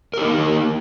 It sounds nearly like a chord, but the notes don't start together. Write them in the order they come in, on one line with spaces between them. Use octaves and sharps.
A#4 G4 D#4 A#3